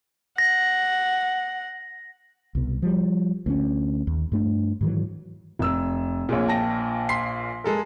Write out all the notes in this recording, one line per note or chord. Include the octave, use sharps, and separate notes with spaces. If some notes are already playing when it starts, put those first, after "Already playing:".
F#5 A#6
C2 B2
F3 G3
D2 B3 C#4
D#2
G2 A3 D4
G#2 D#3 E3 F#3
F1 E6
A#1 A#2 F4 G#4 C#5
G5 A5 A#6
C6 B6 C7
G#3 A4 A#4